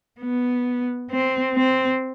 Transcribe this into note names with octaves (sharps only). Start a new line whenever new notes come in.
B3
C4
C4